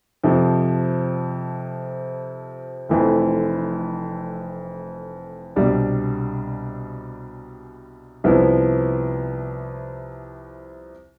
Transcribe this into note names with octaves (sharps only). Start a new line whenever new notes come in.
F2 C3 F3
F1 F2 E3 A3 E4
C2 B2 G3 D4
C2 C3 F3 B3 E4